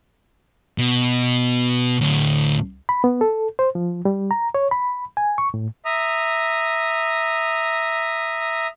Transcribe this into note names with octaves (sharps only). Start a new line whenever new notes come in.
B2
D2 A2
B5
B3
A4
C5
F3
G3
A#5
C#5
B5
G#5
C#6
A2
E5 A#5 D#6